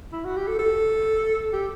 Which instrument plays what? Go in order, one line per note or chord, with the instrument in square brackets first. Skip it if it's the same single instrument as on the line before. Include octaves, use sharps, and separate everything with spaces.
[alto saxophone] E4
F#4
G4
A4
A4
G4